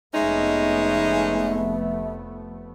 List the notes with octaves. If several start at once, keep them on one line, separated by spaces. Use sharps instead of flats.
F1 G#3 A3 B3 C#4 D#4 E5